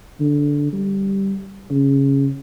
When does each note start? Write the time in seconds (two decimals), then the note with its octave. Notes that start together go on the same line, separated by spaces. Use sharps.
0.20 D3
0.73 G3
1.71 C#3